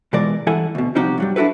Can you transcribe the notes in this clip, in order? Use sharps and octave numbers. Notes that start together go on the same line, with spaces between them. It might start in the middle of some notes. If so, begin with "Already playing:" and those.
B2 E3 G#3 F4 A#4 D5
G2 E3 E4 A4 F#5 G#5
D2 B2
C3 F3 G3 D#4 F#4 G4
G2 F#3 G3
D4 E4 F#4 A4 B4